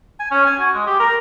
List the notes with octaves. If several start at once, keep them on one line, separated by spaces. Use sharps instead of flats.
G#5
C#4
G#5
F#4
G#3
G4
A#4